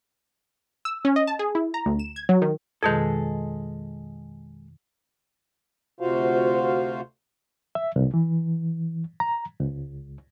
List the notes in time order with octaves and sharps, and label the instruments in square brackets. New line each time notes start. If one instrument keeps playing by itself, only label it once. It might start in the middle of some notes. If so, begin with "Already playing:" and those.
[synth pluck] E6
C#4
D#5
A5
G#4
E4
A#5
D2
E7
G#6
F#3
D#3
[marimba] F2 B2 D#3 [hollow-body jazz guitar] G#3 A4
[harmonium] D2 C3 F4 F#4 C5 F5
[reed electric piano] E5
C2
E3
A#5
C#2